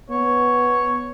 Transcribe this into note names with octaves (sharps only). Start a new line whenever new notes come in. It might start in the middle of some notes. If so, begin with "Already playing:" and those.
B3 C#5